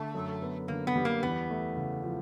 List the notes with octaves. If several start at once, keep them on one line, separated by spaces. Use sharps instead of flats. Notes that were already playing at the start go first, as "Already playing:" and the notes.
Already playing: D3 A3
F#2
B3
D3 A#3
B3
G3
A#3
E2 B3
A3
C#3
F3